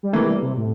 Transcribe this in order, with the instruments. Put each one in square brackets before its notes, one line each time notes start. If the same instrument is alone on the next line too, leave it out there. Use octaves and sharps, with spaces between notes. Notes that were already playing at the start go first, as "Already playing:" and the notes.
[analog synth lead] G3
[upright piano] C3 E3 A#3 [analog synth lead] A3
[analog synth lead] G3
C3
A2